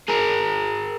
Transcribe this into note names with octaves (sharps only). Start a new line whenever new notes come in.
G#4 A#4